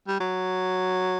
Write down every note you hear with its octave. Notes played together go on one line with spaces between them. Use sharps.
G3
F#3